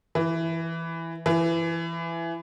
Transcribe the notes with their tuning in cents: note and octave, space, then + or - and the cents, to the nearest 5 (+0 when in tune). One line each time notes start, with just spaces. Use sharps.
E3 +5
E3 +20